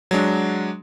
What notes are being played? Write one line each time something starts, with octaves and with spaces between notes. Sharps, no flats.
F#3 G#3 D4